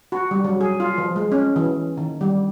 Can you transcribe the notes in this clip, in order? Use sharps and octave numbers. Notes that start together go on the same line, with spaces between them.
F#4
G3
F#3
G#4
F4
F3
G#3
C#4
E3
D#3
G3